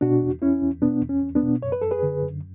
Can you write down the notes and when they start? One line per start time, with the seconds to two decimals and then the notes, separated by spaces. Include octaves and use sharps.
0.01 B2 D4 F#4
0.22 E2
0.42 E2 C#4 E4
0.61 E2
0.82 B2 B3 D4
1.02 E2
1.09 C#4
1.22 E2
1.35 B3 D4
1.42 B2
1.62 F#2 C#5
1.72 B4
1.82 F#2 A4
1.91 G#4 B4
2.03 D3
2.23 F#2